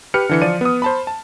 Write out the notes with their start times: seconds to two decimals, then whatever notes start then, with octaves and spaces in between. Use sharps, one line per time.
0.14 G4 B4 F6 C#7
0.29 D3 E3 C#7
0.42 F3 F4 D5 D#7
0.61 B3 D#6
0.82 C5 A5 B5
1.07 A5